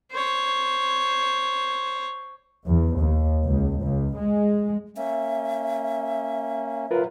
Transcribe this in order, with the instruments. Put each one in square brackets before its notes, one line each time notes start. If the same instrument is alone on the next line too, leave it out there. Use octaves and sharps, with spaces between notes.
[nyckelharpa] C5 C#5
[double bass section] E2
D#2
C#2
C#2
G#3
[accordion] A#3 C#4 [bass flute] E5
[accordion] F#3 [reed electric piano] F4 A#4 B4